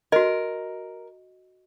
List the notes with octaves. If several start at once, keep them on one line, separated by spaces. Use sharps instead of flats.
F#4 A#4 D#5